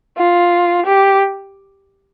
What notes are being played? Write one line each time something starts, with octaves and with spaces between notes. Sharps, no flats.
F4
G4